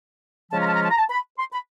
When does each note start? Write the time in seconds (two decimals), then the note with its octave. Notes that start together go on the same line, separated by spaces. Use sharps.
0.51 C#3 F3 G#3 C#4 F4 A5
0.60 A#5
0.67 A5
0.75 A#5
0.83 A5
0.91 A#5
0.98 A5
1.10 B5
1.39 C6
1.53 B5